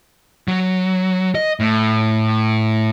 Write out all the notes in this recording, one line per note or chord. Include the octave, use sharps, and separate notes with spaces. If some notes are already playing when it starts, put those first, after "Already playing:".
F#3
D#5
A2